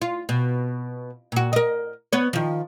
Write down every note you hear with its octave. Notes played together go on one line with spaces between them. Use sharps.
F4
B2
A#2 F#4
A#4 D#5
B3 C#5
D#3 F3